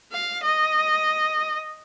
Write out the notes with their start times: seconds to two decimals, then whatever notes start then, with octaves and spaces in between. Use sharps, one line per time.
0.12 F5
0.42 D#5